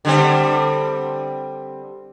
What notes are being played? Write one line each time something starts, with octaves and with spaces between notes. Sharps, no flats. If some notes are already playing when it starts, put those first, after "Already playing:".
D3 G3 C4